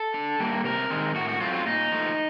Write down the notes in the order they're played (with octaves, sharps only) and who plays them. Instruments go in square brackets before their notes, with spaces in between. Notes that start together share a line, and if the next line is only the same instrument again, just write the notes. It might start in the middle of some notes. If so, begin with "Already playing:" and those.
Already playing: [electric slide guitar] A4
D3
G3 A#3
C3 A#4
D#3 G#3 C4
A2 F#4
F#4
F#3 A3 C4 F4
F4
A#2 D#4
F3 A3